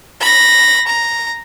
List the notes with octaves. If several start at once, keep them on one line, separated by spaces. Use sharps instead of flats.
B5 A#6
A#5